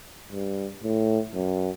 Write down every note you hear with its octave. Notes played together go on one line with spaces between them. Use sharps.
G2
A2
F#2